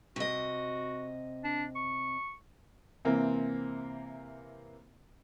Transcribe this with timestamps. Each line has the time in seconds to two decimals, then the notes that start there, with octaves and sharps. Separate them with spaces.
0.16 C3 F#4 D#5
1.44 D4
1.75 C#6
3.05 C3 E3 A#3 C4